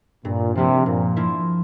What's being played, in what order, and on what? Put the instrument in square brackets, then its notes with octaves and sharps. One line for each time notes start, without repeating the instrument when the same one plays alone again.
[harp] G2 [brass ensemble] A#2
[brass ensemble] C3 [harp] F3 A#3 E4
[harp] G2 [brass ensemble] A#2
[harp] F3 A#3 E4